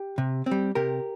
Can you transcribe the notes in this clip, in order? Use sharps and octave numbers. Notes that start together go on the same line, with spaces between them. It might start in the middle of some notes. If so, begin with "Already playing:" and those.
Already playing: G4
C3
C4
G3
C3 G4 A#4